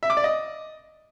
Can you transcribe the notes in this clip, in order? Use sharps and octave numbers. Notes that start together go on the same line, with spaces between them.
E5
D6
D5
D#5